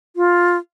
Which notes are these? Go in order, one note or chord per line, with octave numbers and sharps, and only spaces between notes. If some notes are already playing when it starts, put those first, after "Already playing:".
F4